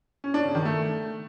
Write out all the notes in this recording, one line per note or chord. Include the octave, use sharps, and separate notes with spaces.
C#4
D4
C#3
D#3
A3